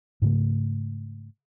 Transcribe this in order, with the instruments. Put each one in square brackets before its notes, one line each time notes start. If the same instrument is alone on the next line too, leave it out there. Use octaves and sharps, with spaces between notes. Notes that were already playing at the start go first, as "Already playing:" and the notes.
[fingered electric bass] G#2 C#3 A3